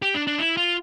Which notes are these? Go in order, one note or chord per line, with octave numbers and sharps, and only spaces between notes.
G4
D4
D4
E4
F4